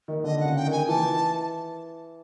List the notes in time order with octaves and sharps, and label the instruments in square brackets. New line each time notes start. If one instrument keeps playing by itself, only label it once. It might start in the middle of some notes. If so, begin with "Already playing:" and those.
[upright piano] D#3
[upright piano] D3 [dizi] D#5
[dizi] F#5
[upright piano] C#3
[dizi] G5
[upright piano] D#3
[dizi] G#5
[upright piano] E3 [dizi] A5